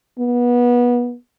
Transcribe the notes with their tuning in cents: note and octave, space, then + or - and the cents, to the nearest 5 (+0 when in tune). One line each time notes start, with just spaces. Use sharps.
B3 -25